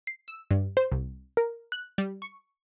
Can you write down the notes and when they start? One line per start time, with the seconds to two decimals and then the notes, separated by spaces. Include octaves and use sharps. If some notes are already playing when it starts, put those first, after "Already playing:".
0.07 C7
0.28 E6
0.51 G2
0.77 C5
0.92 C2
1.37 A#4
1.72 F#6
1.98 G3
2.22 C#6